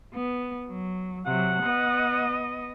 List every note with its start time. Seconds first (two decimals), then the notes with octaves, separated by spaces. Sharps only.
0.14 B3
0.69 F#3
1.26 C3 F#3 F#5
1.63 B3 D#5